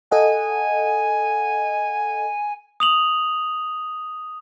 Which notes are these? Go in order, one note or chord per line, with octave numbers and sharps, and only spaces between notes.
A4 D#5 F#5 G#5
D#6 F7 F#7